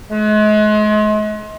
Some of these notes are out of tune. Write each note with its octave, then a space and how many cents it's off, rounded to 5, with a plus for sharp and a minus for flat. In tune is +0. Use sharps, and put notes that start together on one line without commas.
G#3 +40